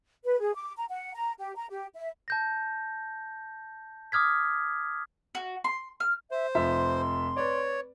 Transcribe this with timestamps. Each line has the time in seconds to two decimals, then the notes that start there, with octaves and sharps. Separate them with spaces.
0.25 B4
0.40 G#4
0.54 D6
0.77 A#5
0.89 F#5
1.14 A#5
1.38 G4
1.56 A#5
1.70 G4
1.95 E5
2.28 A5 G6 A#6
4.12 D6 D#6 F6 G#6 B6
5.35 F#4
5.64 C6
6.00 F6
6.31 C5 E5
6.55 F1 F3 E5 C6
7.36 B4 C#5 D5